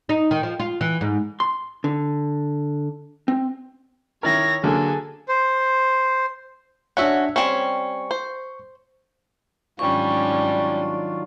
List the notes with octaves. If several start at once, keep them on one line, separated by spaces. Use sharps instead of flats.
D#4
D#3
F3
F4
E3
G#2
C6
D3
C4
D#3 E4 A#4 C#5 A#6
D3 F#3 A#3 G#4 A4
C5
C#4 D4 F#4 E5 F#5
G3 C4 C#4 C#6
C5
G#2 D#3 F#3 G3 C#4 D4 F4 C#6